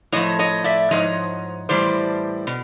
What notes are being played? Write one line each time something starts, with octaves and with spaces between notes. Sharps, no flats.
A2 F3 C#5 D#5
C#5 D#5
D5 E5
G#2 F3 C#5 D#5
A2 E3 G3 C5 D5
B2